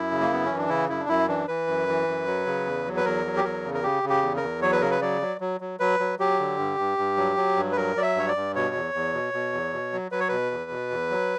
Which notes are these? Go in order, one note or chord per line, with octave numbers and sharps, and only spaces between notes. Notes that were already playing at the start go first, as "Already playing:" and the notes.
Already playing: F#2 E4
C#3
A#3
F#2 B3
C#4
E3
D4
C#3 E4
F#2 E4
D4
F#2 E4
E3 D4
E3 B4
F#2
E3
F#2
F#3
C#3
E2
F#3
B4
E2 A#4
F#3
G4
E2 A#4
C#3
A#4
C#3 G4
C#3
G4
E2
A#4
E2
F#3 C#5
B4
C#3 A#4
B4
F#3 D5
F#3
F#3
F#3
F#3 B4
F#3
F#3 G4
D3
G2
G2
G2
F#3
F#3
G2
B4
F#3 A#4
F#3 D5
E5
G2 C#5
D5
G2
B2 C#5
E2
E2
B2
B2
E2
B2
F#3
F#3 B4
C#5
B2 B4
E2
B2
E2
F#3